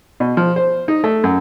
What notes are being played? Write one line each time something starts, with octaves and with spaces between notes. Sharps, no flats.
B2
F3
C5
D#4
A3
F#2